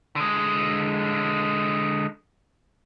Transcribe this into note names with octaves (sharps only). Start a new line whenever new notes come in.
D3 G#3